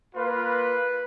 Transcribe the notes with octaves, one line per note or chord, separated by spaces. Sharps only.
A#3 F4 B4